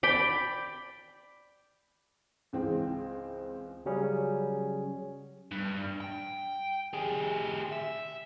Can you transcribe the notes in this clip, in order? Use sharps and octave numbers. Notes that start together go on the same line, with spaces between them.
D5 G5 B5
C#2 E3 C4 G#4 G5
C#3 F#3 G3 C#4 G#4
G2
G5
G3 G#4
E5